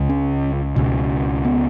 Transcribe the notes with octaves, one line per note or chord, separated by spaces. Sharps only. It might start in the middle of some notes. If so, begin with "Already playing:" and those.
Already playing: C#2 C#3
C#4
C#2 B2
B3